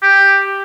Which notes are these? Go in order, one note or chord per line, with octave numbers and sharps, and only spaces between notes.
G4